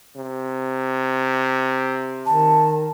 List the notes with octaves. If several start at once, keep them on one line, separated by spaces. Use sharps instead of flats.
C3
D#3 A5